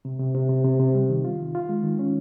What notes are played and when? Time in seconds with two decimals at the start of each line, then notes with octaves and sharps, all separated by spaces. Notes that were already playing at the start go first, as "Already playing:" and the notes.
0.05 C3
0.20 C3
0.35 C3
0.49 C3
0.64 C3
0.80 C3
0.95 G3
1.10 D#3
1.25 F4
1.40 D#3
1.55 F4
1.69 G#3
1.84 D#3
1.99 C#4